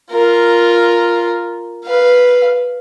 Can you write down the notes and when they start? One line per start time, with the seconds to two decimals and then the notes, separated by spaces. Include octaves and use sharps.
0.12 F4 A#4
1.85 B4 F5